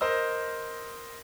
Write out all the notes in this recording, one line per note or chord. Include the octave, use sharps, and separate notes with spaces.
A#4 C5 D#5 E6